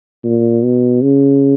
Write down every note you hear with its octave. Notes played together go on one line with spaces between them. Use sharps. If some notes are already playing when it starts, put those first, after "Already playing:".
A#2
B2
C#3